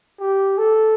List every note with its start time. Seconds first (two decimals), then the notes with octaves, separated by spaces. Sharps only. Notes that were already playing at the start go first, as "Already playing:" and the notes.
0.20 G4
0.58 A4